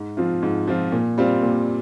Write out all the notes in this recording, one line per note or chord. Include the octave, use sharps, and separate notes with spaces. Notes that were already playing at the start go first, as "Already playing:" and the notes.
Already playing: G#2
F3 C4 F4
G#2
F3 C4 F4
A#2
G3 C4 F4
A#2